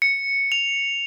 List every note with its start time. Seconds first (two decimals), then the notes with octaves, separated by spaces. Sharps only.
0.02 C#7
0.52 F7